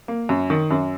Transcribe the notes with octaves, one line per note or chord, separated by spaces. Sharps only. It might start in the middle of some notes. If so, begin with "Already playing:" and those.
A#3
F#2
D#3
F#2